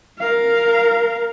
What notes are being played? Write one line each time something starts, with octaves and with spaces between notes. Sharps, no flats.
A#4 F5